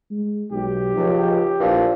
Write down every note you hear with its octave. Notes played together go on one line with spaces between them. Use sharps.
G#3
B1 G4
C#2 F3
A#1 A#2 E3 F3